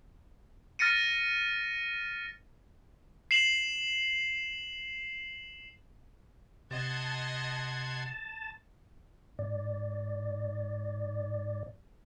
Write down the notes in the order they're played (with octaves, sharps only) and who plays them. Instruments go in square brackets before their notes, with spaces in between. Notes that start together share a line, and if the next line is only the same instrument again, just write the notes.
[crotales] F6 A6 A#6 C#7 D#7
C7 E7 F#7
[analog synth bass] C3 [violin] D#5 [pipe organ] F#5 C6 G#6 [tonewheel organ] A5
[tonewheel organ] G#2 D5